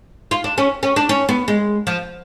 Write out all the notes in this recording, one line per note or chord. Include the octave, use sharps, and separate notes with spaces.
F4
D4
C#4
C#4
D4
C#4
B3
G#3
F3